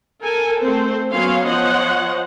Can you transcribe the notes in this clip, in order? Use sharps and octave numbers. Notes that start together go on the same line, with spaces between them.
A4 A#4 G#5
A3 C4 A4 C5
F#3 B3 C#4 C#5 F5 C6
F3 C5 C#5 D#5 F#5